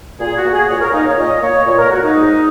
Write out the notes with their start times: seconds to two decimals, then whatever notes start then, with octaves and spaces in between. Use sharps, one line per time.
0.20 A#2 G#4
0.37 F#4
0.45 A#3
0.53 G#4
0.69 A#2 C#5
0.81 A#4
0.93 A#3 D#4
1.05 C#5
1.18 A#2 D#5
1.42 A#3 C#5
1.66 A#2 C#5
1.79 A#4
1.90 A#3 F#4
2.03 D#4
2.15 G#2